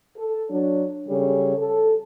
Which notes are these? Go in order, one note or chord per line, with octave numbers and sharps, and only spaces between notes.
A4
F#3 D4 C#5
C#3 G3 C#4 G#4 A4 C#5
A4